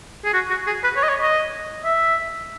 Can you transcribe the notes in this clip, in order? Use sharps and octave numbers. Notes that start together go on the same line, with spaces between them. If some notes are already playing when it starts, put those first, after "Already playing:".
G#4
F#4
F#4
G#4
B4
C#5
D#5
C#5
D#5
E5